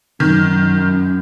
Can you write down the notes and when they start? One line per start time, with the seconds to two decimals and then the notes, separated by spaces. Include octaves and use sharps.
0.20 F#2 D#3